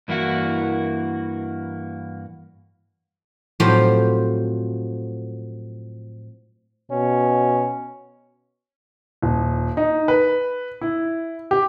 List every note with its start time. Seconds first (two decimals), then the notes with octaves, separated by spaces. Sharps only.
0.08 G2 E3 A#3 E4 F#4
3.60 A2 F3 F#3 C4 F4 G4
6.91 B2 C#4
9.22 D#1
9.77 D#4
10.08 B4
10.81 E4
11.51 G4